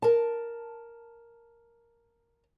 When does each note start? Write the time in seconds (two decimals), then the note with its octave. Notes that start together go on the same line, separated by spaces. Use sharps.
0.02 A#4 A5